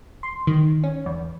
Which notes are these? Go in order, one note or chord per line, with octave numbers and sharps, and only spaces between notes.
C6
D#3
C#4
E2